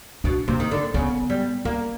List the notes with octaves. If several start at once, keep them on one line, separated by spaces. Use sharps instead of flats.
B2 D4
C3 A#3
D#3
D3
C#3 B3
G3
A#3 C#4